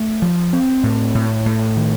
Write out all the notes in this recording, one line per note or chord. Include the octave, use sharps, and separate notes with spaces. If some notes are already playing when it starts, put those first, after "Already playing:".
Already playing: A3
F3
C4
A2
A2
A2
D#3